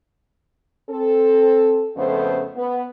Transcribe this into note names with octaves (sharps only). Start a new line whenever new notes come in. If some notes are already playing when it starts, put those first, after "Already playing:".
C4 A4
F2 C#3 A3 B3 C5
B3